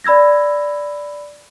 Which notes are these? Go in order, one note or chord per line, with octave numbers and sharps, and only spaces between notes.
D5 B5 E6 G#6 A#6